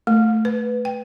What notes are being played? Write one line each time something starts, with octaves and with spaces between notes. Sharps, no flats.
A3
B4
G5